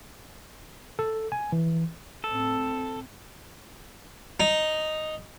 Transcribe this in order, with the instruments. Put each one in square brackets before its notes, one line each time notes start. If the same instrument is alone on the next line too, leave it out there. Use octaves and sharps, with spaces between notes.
[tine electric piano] A4
G#5
E3
[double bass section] A2 C4 [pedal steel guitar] A4
[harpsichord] D#4